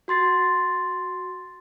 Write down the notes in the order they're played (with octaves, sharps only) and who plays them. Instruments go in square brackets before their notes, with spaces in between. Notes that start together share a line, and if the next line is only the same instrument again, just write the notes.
[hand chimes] F#4 C6 A6 C7